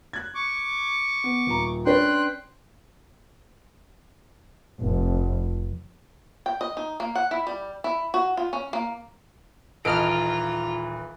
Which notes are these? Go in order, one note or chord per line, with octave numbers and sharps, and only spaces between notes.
F#6 G#6
C#6 D6
B3
D#1 A#5
C#4 D4 B4 G5 C6 F#6
F1
G5
D#5
D#4
A#3
F#5
E4
G3
E4
F#4
F4
C#4
A#3
D#1 E3 F4 A4 D#5 A#5 F6 D7